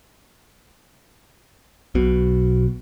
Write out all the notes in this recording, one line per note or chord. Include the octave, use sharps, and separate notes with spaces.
B1 B2